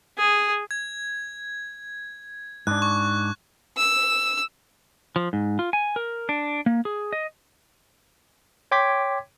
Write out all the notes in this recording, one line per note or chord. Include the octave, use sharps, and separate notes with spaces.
G#4
G#6
G#2 D4 F#6
C#6
E6
F3
G#2
F4
G#5
A#4
D4
A#3
G#4
D#5
C#5 G5 C6 D6 G#6 B6